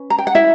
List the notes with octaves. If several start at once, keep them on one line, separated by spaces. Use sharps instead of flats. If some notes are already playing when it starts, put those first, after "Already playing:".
Already playing: C#4 B4
A#5
G5
F#5
E4 E5